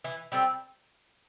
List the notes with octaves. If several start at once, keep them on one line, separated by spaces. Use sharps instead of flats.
E3
G3 C4 A4